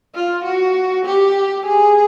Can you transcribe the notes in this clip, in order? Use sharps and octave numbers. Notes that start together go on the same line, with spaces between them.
F4
F#4
G4
G#4